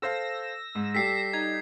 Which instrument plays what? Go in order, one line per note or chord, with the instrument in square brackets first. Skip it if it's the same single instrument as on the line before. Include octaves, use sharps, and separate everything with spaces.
[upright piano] A4 C5 F5 [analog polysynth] E6 A#6
[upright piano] G#2
[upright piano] G3 G4 A4 [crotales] B6 C7
[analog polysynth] D#4 [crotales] G#6